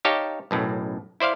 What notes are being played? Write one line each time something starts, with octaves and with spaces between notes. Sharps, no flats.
D#4 G4 C#5 F5 A5
B1 F#2 A2
E4 C5 D5 F5